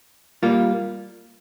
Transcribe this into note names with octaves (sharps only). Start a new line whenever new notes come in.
G3 A#3 F4